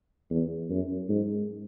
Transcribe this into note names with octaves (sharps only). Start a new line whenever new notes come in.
E2
F#2
G#2